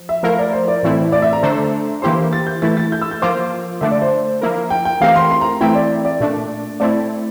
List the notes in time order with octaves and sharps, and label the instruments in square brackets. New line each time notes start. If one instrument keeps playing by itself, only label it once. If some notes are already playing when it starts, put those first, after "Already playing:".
Already playing: [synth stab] F3
[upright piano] E5
[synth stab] F3 A3 E4 A#4 [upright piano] F5
[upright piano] D5
C5
D5
[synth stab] A2 E3 A3 C4 E4
[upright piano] D5
E5
A#5
[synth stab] D3 A3 D4 A4 C5
[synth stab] E3 A#3 E4 G4 C5 [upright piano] C6
[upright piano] A6
G6
[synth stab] E3 A3 E4 [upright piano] A6
[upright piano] A6
G6
E6
G6
[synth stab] F3 A#3 F4 C5 [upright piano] D6
[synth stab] D3 A3 D4 [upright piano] E5
[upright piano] D5
C5
[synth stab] F3 A#3 E4 A#4
[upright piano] G5
G5
[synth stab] E3 A3 C4 G4 A#4 [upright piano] F5
[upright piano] C6
C6
A#5
[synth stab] E3 A3 C4 E4 [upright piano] G5
[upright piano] D5
D5
[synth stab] A#2 A3 D4
[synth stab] A3 C4 E4 [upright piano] D5